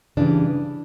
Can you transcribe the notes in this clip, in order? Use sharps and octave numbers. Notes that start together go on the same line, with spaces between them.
C#3 E3 G3 D4